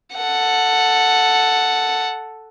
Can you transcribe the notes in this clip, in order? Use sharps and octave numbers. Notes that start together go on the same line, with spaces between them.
A4 F#5